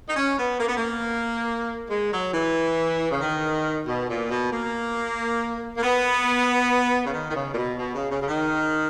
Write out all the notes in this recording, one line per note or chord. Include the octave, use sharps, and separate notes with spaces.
D#4
C#4
B3
A#3
B3
A#3
G#3
F#3
E3
C#3
D#3
B2
A#2
B2
A#3
A#3
B3
C#3
D#3
D#3
C#3
A#2
B2
B2
C#3
C#3
C#3
D#3